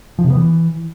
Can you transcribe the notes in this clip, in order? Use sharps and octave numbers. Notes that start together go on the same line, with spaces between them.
F3
C3
B3
E3